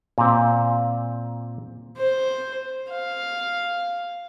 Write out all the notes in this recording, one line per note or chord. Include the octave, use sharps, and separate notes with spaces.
A#2 C4
C5
F5